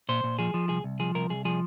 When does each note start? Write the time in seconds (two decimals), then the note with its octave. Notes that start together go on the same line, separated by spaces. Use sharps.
0.09 A#2 C5
0.24 A#2
0.39 F3 G#4
0.54 F3
0.69 C2 G#4
0.84 C2
1.00 F3 G#4
1.15 C2 A#4
1.30 C2 G#4
1.45 F3 G#4